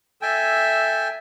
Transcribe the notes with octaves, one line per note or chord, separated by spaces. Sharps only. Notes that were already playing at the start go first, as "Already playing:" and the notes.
A4 E5 G5 G#5